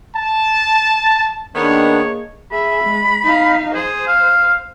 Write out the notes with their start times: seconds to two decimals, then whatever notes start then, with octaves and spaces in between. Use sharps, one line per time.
0.15 A5
1.55 D#3 A#3 B3 D4 G#4 C#5 D#5
2.52 G#4 E5 B5
2.84 G#3
3.24 D#4 F5
3.75 G#4 C5
4.07 F5